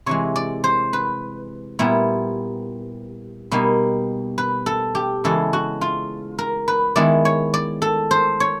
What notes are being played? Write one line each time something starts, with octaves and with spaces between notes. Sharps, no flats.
C3 E3 G#3 C#5
D5
C5
B4
A#2 G3 B3 E4
B2 G3 A#3 D#4
B4
A4
G4
C#3 E3 G#3 B3 A4
F#4
F4
A#4
B4
D#3 G#3 B3 E4 D5
C#5
D5
A4
C5
C#5